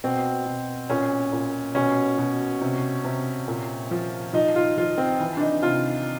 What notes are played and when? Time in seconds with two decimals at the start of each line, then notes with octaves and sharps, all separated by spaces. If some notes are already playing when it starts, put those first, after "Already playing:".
0.04 B2 C4
0.46 B2
0.90 A#2 C#4
1.32 A#2
1.75 B2 C#4
2.18 B2
2.61 C3
3.05 C3
3.48 A#2
3.91 F3
4.33 F3 D#4
4.55 F4
4.77 F3 F4
4.98 C4
5.20 E3
5.37 D4
5.41 D#4
5.62 C3 F4